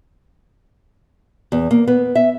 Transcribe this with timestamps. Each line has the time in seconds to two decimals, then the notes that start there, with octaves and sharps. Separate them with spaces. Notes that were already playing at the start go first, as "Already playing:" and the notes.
1.52 E2
1.71 A#3
1.88 B3
2.15 E5